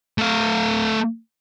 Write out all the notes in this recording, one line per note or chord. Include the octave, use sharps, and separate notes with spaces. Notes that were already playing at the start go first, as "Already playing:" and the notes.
A3 F5